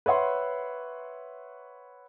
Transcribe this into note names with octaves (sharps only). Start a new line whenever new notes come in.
B4 C#5 E5 F#5 C6